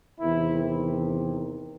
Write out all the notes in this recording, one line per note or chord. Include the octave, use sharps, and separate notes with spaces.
E2 C3 D#3 E4